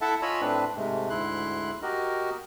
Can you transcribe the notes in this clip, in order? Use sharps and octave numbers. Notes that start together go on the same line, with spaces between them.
E4 A4 E5 F#5 A5
F4 C#5 D#5 G#5 B5 E6
A2 C4 D4 B4
G#2 C3 G#3 A3
D2 G#2 E4 C6 F#6
F#4 G4 A#4 D#5